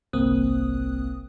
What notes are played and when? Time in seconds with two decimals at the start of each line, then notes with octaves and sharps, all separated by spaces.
0.13 G1 C2 A#3 C4 D#6 F#6